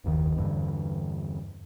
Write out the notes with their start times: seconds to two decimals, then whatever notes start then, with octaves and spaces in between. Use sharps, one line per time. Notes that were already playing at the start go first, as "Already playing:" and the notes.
0.04 F#1 D#2 D#3
0.36 E2 G2 D3